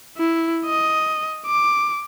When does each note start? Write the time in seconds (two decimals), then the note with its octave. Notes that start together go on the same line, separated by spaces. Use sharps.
0.18 E4
0.66 D#5
1.46 D6